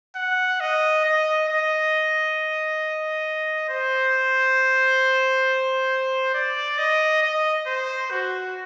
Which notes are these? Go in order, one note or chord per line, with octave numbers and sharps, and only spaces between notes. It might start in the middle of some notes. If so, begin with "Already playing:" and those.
F#5
D#5
D#5
D#5
C5
D5
D#5
D#5
C5
F#4